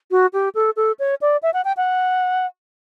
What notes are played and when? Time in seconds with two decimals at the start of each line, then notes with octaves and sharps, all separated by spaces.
0.11 F#4
0.34 G4
0.55 A4
0.77 A4
0.99 C#5
1.22 D5
1.43 E5
1.54 F#5
1.65 G5
1.77 F#5